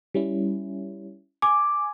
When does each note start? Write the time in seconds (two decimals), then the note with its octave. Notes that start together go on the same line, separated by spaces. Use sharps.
0.14 G3 C#4 E4
1.42 G#5 D6